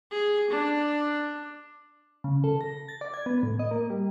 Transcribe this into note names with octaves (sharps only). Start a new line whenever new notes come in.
G#4
D4
C#3
A4
A#6
A6
D5
G#6
B3
A2
D#5
A#3
G3